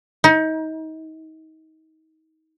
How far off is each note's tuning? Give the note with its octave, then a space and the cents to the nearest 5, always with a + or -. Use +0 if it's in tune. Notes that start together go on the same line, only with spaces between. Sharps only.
D#4 +30